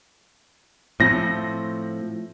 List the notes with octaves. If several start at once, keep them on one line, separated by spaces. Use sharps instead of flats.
A2 F3 C4 A#6